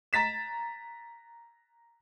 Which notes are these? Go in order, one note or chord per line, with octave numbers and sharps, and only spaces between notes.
A#5 A6 B6 E7